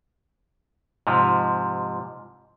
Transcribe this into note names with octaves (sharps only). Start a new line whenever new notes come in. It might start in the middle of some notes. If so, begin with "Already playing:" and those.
G#2 C3 F3